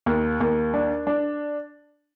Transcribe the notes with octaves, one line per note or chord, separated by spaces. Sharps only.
D#2
D#2
D4
D4